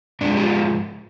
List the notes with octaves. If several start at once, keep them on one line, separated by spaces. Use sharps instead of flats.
G#2 F3 G#3 D4
G4
F4